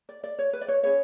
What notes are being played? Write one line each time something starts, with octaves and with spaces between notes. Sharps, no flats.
D5
D5
C#5
B4
D5
C#5
C#4 G#4 B4 C#5